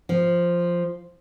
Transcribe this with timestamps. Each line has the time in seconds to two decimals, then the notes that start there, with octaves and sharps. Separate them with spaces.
0.09 F3